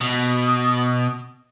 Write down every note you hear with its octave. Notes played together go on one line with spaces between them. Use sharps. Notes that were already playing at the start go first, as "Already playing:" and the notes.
B2